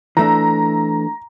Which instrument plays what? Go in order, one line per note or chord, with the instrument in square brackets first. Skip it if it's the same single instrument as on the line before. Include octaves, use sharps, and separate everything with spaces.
[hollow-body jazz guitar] E3 A3 D4 [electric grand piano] A#5